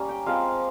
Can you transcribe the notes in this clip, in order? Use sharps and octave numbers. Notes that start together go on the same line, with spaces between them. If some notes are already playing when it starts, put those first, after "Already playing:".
Already playing: G3 A#3 C#4 A#5
G5
F3 G#3 C4 F5